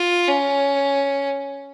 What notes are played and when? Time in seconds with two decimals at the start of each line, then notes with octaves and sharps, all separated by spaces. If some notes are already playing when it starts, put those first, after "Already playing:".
Already playing: F4
0.28 C#4